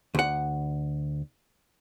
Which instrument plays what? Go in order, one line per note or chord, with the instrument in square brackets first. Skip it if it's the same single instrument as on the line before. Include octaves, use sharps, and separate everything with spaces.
[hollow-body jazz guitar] D2 F#5